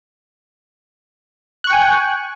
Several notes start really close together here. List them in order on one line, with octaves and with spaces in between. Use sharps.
F#6 C#6 G5 G#5